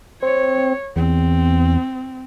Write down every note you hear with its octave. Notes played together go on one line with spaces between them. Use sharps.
C4 C#5
E2 C4